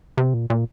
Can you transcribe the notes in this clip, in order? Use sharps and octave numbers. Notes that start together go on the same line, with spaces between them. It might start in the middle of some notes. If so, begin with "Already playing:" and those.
C3
A#2
A#2